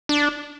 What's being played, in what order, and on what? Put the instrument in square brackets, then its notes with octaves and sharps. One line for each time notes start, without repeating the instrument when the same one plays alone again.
[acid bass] D4